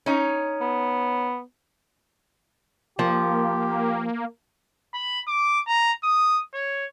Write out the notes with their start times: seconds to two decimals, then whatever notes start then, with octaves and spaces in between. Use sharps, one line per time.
0.06 C#4 D#4
0.61 B3
2.99 F3 A#3 G4
4.94 B5
5.28 D6
5.67 A#5
6.04 D#6
6.54 C#5